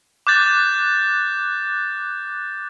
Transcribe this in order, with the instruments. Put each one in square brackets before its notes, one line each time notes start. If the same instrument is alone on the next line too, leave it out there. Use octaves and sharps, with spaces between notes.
[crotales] D6 F#6 G6 A6